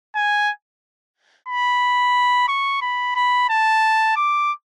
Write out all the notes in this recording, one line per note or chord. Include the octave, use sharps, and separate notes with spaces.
G#5
B5
C#6
B5
B5
A5
D6